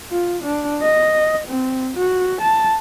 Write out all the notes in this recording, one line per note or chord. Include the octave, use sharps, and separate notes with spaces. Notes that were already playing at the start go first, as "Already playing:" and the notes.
F4
D4
D#5
C4
F#4
A5